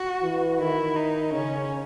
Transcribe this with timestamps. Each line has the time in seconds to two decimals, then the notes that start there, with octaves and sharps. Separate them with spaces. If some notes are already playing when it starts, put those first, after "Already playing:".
Already playing: F#4
0.22 E3
0.59 D#3 E4
0.96 D#4
1.33 C#3 C#4